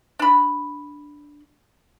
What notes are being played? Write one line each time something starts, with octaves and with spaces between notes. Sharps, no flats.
D4 B5